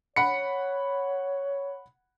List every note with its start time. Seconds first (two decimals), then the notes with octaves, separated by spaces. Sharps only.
0.16 C#5 F#5 B5 C#7